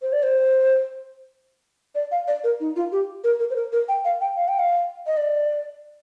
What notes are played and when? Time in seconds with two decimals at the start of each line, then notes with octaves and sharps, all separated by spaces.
0.02 C5
0.13 D5
0.23 C5
1.95 D5
2.12 F5
2.28 D5
2.44 A#4
2.60 D#4
2.76 F4
2.92 G4
3.24 A#4
3.40 A#4
3.50 C5
3.56 A#4
3.72 A#4
3.89 G5
4.05 F5
4.21 G5
4.37 F5
4.48 G5
4.59 F5
5.07 D#5
5.17 D5